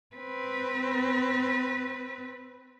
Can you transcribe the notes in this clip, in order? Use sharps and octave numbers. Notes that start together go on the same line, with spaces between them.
C4 B4